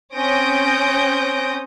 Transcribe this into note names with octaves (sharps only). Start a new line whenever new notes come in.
C4 C#4 D#6 G6 A#6 D7